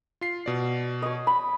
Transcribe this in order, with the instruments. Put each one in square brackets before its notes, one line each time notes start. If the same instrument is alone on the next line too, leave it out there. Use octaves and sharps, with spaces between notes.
[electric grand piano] F4 C7
B2 D5
[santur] C#5 D#5
B5